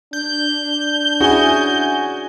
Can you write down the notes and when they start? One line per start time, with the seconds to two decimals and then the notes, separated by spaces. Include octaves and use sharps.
0.13 D4 G6
1.20 C#4 E4 F#4 G#4 G#5